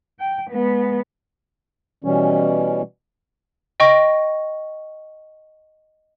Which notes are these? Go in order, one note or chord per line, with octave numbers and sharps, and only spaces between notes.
G5
G#3 B3
B2 E3 G3 C#4
D#5 G5 C#6 A#6